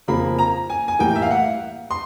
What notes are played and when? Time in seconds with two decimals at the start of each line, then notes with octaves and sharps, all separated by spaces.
0.08 F2 C#3 F3 A#3 B5
0.39 A#5
0.70 G#5
0.88 G#5
0.99 A2 E3 G3 A#3 G5
1.16 E5
1.22 F5
1.31 F#5
1.91 C6